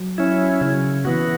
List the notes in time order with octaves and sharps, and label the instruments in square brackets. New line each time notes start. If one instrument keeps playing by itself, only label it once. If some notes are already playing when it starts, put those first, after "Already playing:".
Already playing: [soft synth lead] F#3
[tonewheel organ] C#4 E4
C#3
E3 B3 F#4